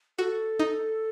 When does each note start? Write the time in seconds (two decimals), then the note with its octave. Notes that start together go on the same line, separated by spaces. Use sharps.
0.18 F#4 A4
0.59 D#4